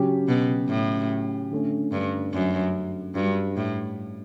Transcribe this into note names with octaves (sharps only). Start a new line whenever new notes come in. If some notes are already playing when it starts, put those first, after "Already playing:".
Already playing: C#3 F#3 C#4 G4
B2
A2
D3 A3 C#4
G2
F#2
G2 G3 D4 F#4
A2